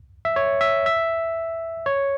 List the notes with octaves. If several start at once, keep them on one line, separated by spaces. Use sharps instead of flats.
E5
C#5
E5
E5
C#5